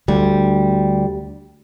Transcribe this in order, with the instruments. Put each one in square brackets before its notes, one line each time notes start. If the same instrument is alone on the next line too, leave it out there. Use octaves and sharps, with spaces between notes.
[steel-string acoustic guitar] D2 G3